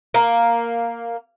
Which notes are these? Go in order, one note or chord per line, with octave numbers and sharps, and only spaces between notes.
A#3